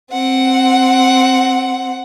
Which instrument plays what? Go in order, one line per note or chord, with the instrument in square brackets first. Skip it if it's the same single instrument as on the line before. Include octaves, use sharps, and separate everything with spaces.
[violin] C4 F#5